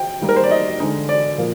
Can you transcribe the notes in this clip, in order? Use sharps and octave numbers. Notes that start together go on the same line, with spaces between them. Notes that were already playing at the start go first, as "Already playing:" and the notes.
Already playing: G5
D#3 G3 A#3 D#4
A#4
C5
D5
D#5
D3 G#3 D#4
D5
A#2 F3 A#3